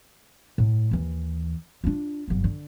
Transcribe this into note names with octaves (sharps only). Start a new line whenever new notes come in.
A2
D#2 E3
D4 F4
G1 F#3
D3